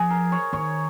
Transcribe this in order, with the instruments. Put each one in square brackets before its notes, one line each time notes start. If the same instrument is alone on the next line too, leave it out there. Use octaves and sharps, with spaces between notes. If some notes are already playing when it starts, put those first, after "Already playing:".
Already playing: [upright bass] F3 [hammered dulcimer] G#4
[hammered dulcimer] A#4
C#5
[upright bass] D#3 [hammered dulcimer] C#5